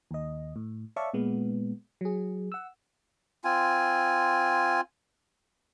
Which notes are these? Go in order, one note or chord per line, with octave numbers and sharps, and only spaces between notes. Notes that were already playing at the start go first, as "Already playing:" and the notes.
D#2 D#5
A2
C#5 D5 E5 F5 A5 C#6
A#2 G#3 B3
F#3 G#4
F#5 E6
C4 F4 G#5